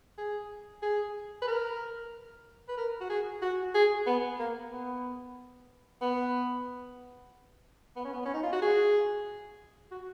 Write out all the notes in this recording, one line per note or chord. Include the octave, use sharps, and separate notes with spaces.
G#4
G#4
B4
A#4
B4
A#4
F#4
G#4
F#4
G#4
B3
A#3
B3
B3
B3
C#4
B3
C#4
D#4
F4
F#4
G#4
F#4